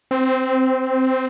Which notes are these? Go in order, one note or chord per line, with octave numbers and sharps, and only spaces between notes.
C4